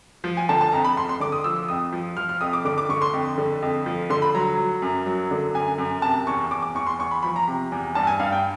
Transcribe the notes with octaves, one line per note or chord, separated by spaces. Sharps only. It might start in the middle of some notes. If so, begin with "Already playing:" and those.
F3
G#5
D3 A5
A5
F2 A#5
B5
F2 C6
C6
D3 D6
D#6
F3 E6
E6
F2 D#6
F3
F3 F6
F6
F2 D#6
D6
D3 D6
D6
D3 C#6
C6
F2
D3
F2
F3
D3 C6
B5
F#3 A#5
F#3
F#2
F#3
D3
F#2 G#5
F#2
C3 A5
E2 C#6
E2 D6
D6
E2 C#6
C6
E2 C#6
B5
F3 B5
A#5
C3
E2
G2 A5
G#5
G2 F5
G5